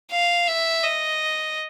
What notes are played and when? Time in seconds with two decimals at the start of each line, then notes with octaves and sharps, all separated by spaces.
0.12 F5
0.47 E5
0.83 D#5